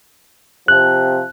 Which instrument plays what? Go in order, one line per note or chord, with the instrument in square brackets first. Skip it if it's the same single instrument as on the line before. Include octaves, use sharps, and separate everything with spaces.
[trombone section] C3 F3 [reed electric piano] F#6